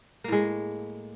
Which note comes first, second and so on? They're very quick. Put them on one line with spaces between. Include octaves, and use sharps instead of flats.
A#3 A2 G#3